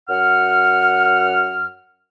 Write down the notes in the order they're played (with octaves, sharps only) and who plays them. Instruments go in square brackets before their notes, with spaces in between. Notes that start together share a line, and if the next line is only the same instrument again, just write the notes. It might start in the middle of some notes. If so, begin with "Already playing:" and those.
[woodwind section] F#2 F#5 F6